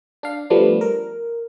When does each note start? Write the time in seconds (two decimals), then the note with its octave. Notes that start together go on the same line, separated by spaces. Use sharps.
0.23 D4 F5
0.50 F3 G3 A3 B3 D4
0.81 A#4